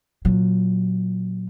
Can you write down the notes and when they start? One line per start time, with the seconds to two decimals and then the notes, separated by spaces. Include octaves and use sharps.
0.25 A#2 F#3